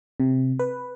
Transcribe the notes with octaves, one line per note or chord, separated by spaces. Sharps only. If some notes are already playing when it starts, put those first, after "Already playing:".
C3
B4